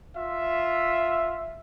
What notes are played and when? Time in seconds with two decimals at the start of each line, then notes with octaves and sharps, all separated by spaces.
0.15 F4 E5